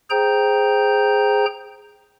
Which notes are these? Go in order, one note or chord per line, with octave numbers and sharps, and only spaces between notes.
G#4 C5 G5 A#5 G6